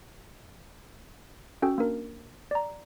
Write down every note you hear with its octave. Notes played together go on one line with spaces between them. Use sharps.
C#4 F#4 A4 G5
A#3 D4 A#4
D5 A#5